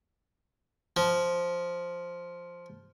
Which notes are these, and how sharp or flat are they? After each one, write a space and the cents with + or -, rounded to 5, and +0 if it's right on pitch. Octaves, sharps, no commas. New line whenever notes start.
F3 +0